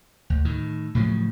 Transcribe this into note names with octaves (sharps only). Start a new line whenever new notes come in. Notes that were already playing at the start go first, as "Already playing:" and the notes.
D2
A2 D#3
A2 C#3 F3 F#3